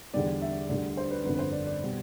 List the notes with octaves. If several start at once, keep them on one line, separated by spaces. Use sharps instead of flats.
E2 D3 G3 D5
E5
D2 D3 G3 D5
C5
B4
G1 F2 D3 B4
B4
C5
D5
D5
B2 G3